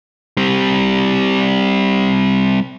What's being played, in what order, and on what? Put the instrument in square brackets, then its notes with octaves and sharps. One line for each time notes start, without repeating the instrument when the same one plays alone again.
[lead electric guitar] G3 C4